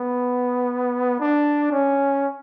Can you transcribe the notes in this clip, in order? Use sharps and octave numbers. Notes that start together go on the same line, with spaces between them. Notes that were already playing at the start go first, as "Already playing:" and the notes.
Already playing: B3
D4
C#4